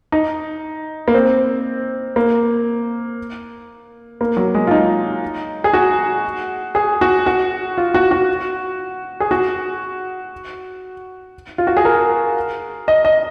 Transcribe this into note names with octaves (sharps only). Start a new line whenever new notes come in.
D#4
A#3
C4
A#3
A#3
F#3
G#3
F4
D#4
G#4
F#4
G#4
F#4
F#4
F4
F#4
F#4
G#4
F#4
F4
F#4
G#4
A#4
D#5
D#5